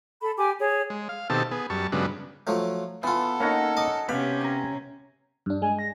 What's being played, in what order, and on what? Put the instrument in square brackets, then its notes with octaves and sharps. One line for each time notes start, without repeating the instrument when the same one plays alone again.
[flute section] A4 B5
G4 G#5 D6
G#4 C#5
[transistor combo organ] G#3
F5
B2 D#3 C4 G4 A4 A5
B3 G#4
F#2 G3 A5 C#6
G2 C#3 F#3 G#3 B3 D4
[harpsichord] F3 F#3 A3
[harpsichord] E3 F4 [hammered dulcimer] B3 [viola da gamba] A4
[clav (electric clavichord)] A#3 D#4 [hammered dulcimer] C#4 F#5 A#5
[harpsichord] D#5 D6
[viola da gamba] C3 C#4 [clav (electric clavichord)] B3 F5 [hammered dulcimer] G4 [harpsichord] B5
[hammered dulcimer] G#5 A#5
[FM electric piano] G2 D4
[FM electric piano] G#3 [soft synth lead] G#5
[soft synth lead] A#6